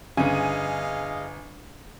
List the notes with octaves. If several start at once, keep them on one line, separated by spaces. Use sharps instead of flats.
G1 C#3 G#4 D#5 F5 G#5